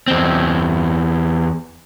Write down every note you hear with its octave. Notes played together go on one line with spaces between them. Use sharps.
E2 C4